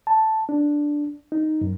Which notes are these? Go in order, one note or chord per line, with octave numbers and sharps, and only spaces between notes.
A5
D4
D#4
F#2